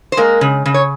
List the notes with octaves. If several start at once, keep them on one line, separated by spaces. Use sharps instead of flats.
C5
G#3 A#3 A#4
C#3
C#3
C#5